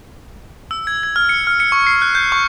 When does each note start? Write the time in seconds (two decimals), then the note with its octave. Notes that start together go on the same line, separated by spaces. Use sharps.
0.71 E6
0.87 G#6
1.03 G#6
1.16 F6
1.29 C#7
1.47 F6
1.60 C#7
1.72 C#6
1.87 C7
2.02 F#6
2.15 G6
2.32 C#6